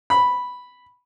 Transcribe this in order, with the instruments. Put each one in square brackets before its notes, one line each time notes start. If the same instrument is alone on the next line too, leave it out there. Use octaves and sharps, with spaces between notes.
[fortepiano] B5